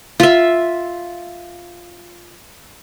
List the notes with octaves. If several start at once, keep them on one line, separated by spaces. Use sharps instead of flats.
F4 E5